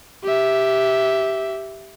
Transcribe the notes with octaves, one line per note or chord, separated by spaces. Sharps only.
G4 E5